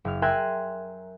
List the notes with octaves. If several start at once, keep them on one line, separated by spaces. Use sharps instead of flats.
F#1 F6
A#4 E5 G5 G#5 C6 F#6